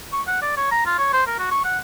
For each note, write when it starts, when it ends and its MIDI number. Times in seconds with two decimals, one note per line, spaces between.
0.13 0.21 85
0.27 0.37 78
0.42 0.56 74
0.57 0.69 73
0.71 0.84 82
0.86 0.95 65
0.98 1.12 73
1.13 1.24 72
1.27 1.38 70
1.39 1.48 66
1.51 1.60 85
1.65 1.78 78